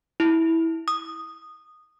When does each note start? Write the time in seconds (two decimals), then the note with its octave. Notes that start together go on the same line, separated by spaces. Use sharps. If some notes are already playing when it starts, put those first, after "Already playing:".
0.20 E4
0.88 D#6